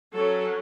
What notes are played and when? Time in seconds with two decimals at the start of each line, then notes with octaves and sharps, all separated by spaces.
0.13 F#3 C#4 A4